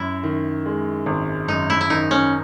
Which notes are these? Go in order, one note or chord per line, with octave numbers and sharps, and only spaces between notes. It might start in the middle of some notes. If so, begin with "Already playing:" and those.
Already playing: F#2 E4
D#3
G#3
G#1
F#2 D#4
E4
E4
D#3 D#4
C#4